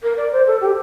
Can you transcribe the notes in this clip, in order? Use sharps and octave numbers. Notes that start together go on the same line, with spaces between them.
A#4
D5
C5
A4
G4